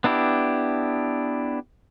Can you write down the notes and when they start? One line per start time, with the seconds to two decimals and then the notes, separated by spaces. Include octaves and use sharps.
0.04 B3 D4 E4 G4